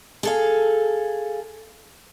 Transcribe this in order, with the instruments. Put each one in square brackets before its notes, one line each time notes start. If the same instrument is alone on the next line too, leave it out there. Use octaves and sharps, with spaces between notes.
[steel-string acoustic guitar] G#4 A4 F5